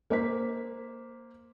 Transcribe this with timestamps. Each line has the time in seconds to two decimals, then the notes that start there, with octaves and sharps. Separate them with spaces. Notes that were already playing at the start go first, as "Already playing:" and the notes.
0.10 A#3 C5 B6